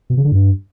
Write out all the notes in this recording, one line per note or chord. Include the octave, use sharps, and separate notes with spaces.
B2
C#3
D3
G2